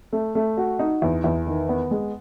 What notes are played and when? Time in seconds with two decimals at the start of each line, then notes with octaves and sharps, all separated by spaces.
0.13 A3
0.35 A3
0.57 F#4
0.79 D#4
1.02 E2
1.24 E2
1.47 D#3
1.69 B3
1.91 G#3